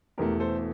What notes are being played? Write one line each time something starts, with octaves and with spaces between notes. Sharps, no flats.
E1 E2 E3 A3 G4 A#4
A4 C5